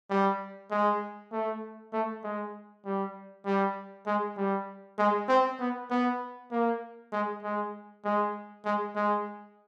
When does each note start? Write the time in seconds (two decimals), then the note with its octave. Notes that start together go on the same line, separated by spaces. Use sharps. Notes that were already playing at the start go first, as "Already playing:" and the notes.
0.10 G3
0.71 G#3
1.32 A3
1.92 A3
2.24 G#3
2.85 G3
3.46 G3
4.07 G#3
4.37 G3
4.98 G#3
5.28 C4
5.60 B3
5.90 B3
6.51 A#3
7.12 G#3
7.43 G#3
8.05 G#3
8.65 G#3
8.96 G#3